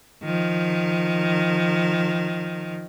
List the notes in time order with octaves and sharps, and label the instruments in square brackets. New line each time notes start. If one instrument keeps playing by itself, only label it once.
[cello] D#3 F3